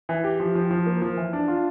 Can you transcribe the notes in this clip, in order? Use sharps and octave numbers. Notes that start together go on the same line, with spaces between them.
E3
G4
F3
F3
F3
A#3
F3
E3
D4
F4